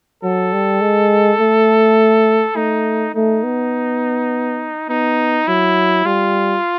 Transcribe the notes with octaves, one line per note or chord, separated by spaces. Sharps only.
F#3 A4
G3
G#3
A3
A3 D#4
A3 D#4
B3
B3 D#4
F#3 E4
G3 F4